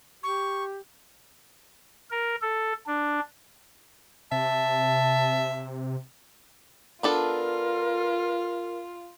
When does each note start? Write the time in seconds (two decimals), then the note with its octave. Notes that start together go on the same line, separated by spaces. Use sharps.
0.23 G4 C#6
2.11 A#4
2.42 A4
2.87 D4
4.32 C3 E5 A5
7.03 B3 D4 F4 A4 A#4